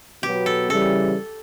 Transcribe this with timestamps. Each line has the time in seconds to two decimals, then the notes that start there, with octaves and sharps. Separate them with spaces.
0.23 B2 F#3 B3 G4
0.46 A4
0.69 C#3 E3 G3 A4